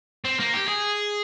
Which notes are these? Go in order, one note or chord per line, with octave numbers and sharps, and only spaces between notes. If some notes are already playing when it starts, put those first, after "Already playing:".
C4
A#3
G4
G#4